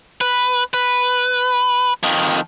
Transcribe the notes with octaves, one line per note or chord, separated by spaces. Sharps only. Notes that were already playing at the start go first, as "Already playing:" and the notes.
B4
B4
F2 D#3